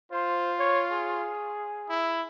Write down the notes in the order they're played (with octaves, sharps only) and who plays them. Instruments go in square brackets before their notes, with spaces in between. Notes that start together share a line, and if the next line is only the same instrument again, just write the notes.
[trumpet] F4 [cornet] C5
[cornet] C#5
G#4
[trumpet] E4